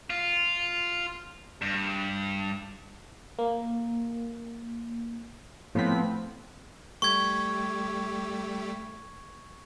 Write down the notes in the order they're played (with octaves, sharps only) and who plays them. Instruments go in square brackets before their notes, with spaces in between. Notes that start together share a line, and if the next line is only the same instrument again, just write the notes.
[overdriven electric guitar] F4
G2
[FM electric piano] A#3
[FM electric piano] A2 B6 [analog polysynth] F3 B3 C4
[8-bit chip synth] G3 A3 G4 [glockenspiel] C#6 G#6